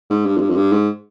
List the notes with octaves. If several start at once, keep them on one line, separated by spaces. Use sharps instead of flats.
G#2
G2
F2
G2
F2
G2
G#2